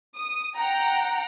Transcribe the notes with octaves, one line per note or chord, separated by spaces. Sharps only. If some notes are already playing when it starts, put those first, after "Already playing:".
D#6
F#5 G5 A#5